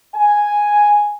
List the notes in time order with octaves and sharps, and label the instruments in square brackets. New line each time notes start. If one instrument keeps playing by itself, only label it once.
[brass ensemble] G#5